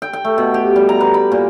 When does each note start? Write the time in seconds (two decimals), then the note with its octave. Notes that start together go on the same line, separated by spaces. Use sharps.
0.02 G5
0.13 G5
0.25 A3
0.38 B2
0.54 G4
0.76 G3
0.89 A#5
1.01 B4
1.14 B5
1.32 A#2